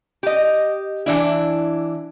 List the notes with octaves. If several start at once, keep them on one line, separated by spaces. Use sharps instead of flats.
G4 D#5
E3 D4 E4